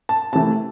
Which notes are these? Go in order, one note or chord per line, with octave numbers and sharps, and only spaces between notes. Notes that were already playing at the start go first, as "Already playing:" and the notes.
A5
C3 E3 A3 A5